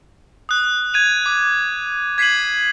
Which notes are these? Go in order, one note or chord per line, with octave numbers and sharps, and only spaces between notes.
D#6 F#6
G#6 D#7 F7
D6
G#6 B6 C7 D#7 F#7